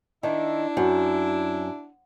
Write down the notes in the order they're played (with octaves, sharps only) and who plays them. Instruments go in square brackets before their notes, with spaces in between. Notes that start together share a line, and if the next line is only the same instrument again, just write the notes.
[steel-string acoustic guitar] D#3 [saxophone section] D4 E4
[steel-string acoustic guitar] F#2